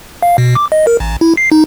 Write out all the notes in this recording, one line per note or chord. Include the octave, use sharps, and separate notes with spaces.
F5
B2
D6
D#5
A#4
A1
E4
C7
D#4